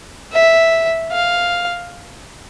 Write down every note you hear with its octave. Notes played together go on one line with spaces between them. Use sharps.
E5
F5